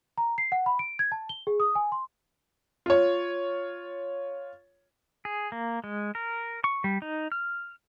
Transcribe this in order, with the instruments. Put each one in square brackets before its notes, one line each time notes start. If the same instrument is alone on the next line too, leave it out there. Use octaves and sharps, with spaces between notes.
[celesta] A#5
C7
F#5
B5
D7
G#6
A5
G7
G#4
D#6
G#5
C6
[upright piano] F4 C#5
[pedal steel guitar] G#4
A#3
G#3
A#4
C#6
G3
D#4
F6